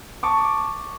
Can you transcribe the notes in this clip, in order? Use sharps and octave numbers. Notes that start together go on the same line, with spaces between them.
A5 C#6 D6